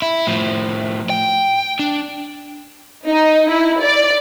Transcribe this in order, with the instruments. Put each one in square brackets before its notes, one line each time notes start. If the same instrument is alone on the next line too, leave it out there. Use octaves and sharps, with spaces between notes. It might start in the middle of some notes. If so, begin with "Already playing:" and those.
[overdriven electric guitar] E4
A2 F3
G5
D4
[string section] D#4
E4
D5